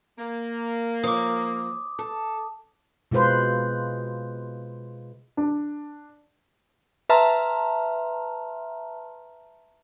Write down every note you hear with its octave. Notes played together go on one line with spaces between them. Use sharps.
A#3
F3 D6 D#6
A4
B2 G#3 F4 B4 C5
D4
B4 E5 A5 A#5 C6 F6